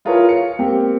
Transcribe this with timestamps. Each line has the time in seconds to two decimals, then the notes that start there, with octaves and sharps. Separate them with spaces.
0.05 E4 F4 G#4 A#4 B4 C#5
0.29 F5 C#7
0.59 A#3 C4 G4